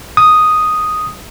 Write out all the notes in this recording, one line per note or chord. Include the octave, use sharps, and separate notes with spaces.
D#6